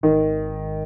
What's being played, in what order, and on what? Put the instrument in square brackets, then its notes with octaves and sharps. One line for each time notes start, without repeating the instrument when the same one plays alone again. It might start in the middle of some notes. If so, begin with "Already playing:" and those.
[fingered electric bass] G#1 [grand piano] D#3